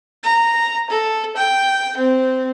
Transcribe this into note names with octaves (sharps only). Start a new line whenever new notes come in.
A#5
A4
G5
C4